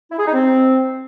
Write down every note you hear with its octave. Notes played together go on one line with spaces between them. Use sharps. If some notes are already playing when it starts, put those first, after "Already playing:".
E4
G#4
D#4
C4